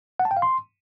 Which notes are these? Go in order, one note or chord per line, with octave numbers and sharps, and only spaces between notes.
F#5
A5
G5
F5
C6